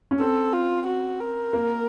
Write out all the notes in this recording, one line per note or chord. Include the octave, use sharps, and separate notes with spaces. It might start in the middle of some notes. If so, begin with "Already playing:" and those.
C#4
C4 A4
F4
F#4
A#4
A#3